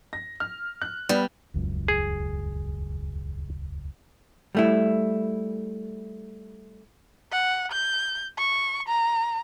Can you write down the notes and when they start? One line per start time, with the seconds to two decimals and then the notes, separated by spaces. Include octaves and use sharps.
0.13 A#6
0.40 F6
0.82 F#6
1.09 G3 B3
1.54 D#1 C#2 F#2
1.88 G#4
4.55 G3 A3 E4
7.32 F#5
7.72 G6
8.38 C#6
8.88 A#5